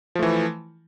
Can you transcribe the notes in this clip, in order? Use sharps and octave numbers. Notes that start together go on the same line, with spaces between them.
E3 F3 A3